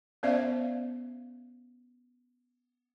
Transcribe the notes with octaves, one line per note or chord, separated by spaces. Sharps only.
B3 C#4 C5 D5 E5 F5